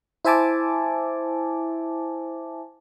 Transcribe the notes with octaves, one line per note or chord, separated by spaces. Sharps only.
E4 C5 E5 G#5 A5 D6